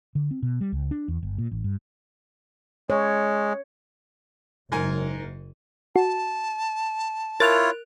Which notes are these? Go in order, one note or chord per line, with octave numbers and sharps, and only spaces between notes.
D3
C4
B2
G3
C#2
D4
E2
G1
A#2
A1
G2
G#3 C#5
F#1 G#2 A#4 G#5
F#4 A5
E4 F4 A#4 C#5 F#6 A6 F7